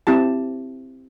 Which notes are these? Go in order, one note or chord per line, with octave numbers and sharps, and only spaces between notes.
C4 E4 G4 A5